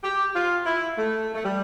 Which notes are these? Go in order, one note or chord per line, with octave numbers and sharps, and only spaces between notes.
G4
F4
E4
A3
A3
G3